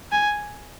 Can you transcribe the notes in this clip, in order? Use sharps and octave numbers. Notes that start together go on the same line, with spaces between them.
G#5